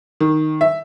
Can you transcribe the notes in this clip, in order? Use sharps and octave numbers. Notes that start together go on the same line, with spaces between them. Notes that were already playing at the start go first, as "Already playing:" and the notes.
D#3
E5